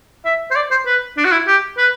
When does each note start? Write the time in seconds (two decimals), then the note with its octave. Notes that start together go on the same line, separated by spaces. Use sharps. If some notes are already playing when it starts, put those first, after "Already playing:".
0.25 E5
0.51 C5
0.56 D5
0.71 C5
0.86 B4
1.17 D4
1.25 F#4
1.32 E4
1.47 G4
1.78 B4